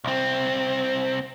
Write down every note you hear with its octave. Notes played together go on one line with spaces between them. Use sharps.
C2 C4